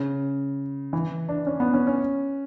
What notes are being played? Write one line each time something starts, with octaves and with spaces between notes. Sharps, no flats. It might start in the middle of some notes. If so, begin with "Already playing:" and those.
Already playing: C#3
E3
D4
C#4
B3
C#4
C#4